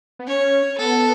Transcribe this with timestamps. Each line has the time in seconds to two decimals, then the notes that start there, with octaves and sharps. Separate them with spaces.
0.19 B3
0.27 C#4 C#5
0.78 B3 A4